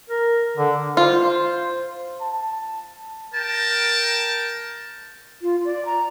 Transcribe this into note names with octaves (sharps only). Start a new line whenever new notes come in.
A#4
D3
F4 C5
A5
A#4 G5 A5
F4
D5
A#5